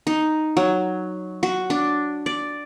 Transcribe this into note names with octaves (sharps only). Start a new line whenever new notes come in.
D#4
F#3
F#4
D4
D5